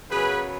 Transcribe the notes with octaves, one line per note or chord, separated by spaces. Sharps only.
F#2 C#3 F#3 B3 G#4 B4